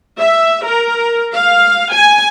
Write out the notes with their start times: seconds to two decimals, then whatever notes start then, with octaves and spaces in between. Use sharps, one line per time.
0.18 E5
0.66 A#4
1.34 F5
1.93 G#5